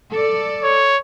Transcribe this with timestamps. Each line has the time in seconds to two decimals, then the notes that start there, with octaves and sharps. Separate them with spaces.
0.12 A4 D5
0.64 C#5